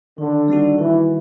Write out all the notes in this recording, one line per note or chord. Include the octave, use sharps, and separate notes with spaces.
D3 D#3
G3 C4 D#4 F#4
D#3 E3